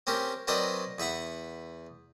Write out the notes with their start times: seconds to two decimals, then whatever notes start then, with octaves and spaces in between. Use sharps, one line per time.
0.07 C4 C#4 G4 A#4
0.48 F#3 C4 A#4 B4 D5 D#5
0.98 E2 B4 E5 F#5 B5